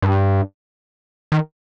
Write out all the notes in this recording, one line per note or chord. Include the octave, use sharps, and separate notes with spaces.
G2
D#3